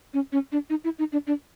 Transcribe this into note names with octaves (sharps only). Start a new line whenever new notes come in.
C#4
C#4
D4
D#4
E4
D#4
D4
D4